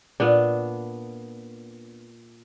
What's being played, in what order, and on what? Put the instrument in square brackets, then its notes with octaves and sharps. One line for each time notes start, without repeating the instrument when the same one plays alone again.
[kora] A#2 B3 D4